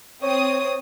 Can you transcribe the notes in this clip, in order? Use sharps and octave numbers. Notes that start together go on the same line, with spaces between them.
C4 C#5 D#6